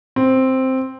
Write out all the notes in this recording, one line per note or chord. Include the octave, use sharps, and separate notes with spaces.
C4